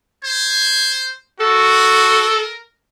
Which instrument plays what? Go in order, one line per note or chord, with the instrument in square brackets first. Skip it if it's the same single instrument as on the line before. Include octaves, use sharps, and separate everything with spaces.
[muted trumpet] C5 [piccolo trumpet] G#6
[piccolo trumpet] F#4 [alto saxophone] A4 [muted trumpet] A#4